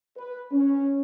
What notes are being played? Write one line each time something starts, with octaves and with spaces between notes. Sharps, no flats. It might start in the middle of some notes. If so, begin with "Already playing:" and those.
B4
C#4